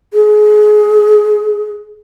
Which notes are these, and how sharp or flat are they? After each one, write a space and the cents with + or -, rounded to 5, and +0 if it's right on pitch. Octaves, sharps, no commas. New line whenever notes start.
G#4 +25